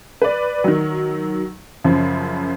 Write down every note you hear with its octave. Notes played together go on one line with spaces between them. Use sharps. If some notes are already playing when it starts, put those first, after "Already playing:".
B4 D5
D#3 F#3
F#2 C#3 F3